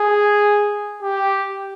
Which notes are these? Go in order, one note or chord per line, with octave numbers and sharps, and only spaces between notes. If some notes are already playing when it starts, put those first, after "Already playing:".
Already playing: G#4
G4